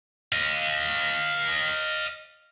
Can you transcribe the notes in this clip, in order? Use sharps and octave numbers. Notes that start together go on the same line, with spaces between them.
D#5 F5